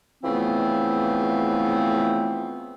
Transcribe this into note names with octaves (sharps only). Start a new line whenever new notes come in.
C#3 E3 F3 A3 B3 C4